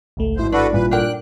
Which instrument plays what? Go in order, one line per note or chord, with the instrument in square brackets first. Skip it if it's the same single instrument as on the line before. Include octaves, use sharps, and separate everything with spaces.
[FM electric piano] G#1 C#2 A3
[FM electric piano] A1 G#2 E4 [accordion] B2 C5
[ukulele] D4 [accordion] F#4 A4 B4
[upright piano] G2 A#2 [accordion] B4
[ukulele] D4 A#4 G5 [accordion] F#6